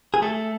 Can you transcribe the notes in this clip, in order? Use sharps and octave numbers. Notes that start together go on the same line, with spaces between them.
G#4
A3 A4